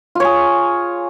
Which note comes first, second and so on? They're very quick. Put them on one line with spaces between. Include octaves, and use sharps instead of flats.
F4 C#5 G#4